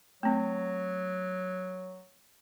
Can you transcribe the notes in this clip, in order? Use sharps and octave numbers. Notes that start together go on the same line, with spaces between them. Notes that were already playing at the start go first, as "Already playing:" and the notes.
F#3 A3 C4